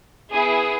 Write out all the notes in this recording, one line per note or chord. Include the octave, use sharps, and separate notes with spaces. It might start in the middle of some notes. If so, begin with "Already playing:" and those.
B3 E4 G#4 G#5